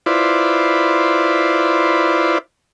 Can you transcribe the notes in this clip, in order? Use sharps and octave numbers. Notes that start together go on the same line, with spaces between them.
E4 F4 B4 C5 D5